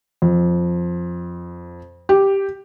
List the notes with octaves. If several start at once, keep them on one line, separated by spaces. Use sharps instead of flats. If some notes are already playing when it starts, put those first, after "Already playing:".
F2
G4